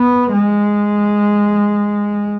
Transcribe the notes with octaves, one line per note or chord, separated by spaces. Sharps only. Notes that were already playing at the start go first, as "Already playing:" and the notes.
Already playing: B3
G#3